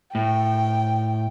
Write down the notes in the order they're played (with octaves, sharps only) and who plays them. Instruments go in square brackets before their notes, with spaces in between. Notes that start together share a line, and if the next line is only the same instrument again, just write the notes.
[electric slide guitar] A2 [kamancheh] G5